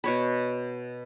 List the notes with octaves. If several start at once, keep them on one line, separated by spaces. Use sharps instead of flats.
B2 C#5 B5